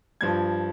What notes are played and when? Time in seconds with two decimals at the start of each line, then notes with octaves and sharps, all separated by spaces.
0.21 G2 F3 G#6